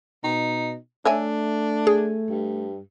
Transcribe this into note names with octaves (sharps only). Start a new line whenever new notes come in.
B2 D#4
A3 D4 C#5 E5 G#5
G#4
G2